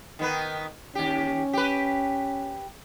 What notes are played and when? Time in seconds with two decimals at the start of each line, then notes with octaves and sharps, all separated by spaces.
0.19 D#3 B3 B4
0.95 D#2 C#4 G4
1.53 G4 B4